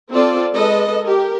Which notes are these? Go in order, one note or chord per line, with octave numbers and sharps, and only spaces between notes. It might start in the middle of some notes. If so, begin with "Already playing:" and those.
C4 F4 A4 D5
G#3 A4 B4 D#5
G4 A#4